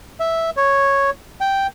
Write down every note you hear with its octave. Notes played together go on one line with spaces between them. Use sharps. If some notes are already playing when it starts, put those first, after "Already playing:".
E5
C#5
G5